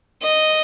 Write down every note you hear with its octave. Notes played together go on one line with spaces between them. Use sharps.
D#5